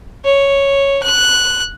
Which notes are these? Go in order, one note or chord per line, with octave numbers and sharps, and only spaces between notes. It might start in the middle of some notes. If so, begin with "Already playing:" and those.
C#5
F#6